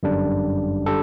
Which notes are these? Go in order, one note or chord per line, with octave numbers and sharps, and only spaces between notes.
G1 F#2 D3 G3 D4
D3 G3 A4